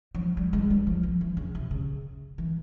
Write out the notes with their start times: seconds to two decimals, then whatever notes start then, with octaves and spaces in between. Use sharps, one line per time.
0.15 F3
0.37 G3
0.53 G#3
0.70 G3
0.87 F3
1.03 F3
1.21 E3
1.37 C#3
1.55 C3
1.71 C#3
2.38 E3